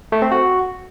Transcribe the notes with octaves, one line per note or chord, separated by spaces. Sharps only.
A3
C4
F#4